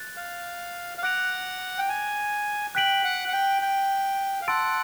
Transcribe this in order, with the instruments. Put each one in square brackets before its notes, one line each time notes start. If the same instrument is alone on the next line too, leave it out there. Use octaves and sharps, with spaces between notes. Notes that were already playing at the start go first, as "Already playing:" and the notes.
Already playing: [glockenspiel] F#6 A6
[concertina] F5
F5
[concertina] F#5 [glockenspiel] D6 F#6 A#6 D7 F7
[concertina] G5
G#5
[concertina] G5 [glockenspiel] F#6 B6 D7 F#7
[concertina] F#5
F#5
G5
G5
F5
[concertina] F#5 [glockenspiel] A5 C6 E6 A6 D7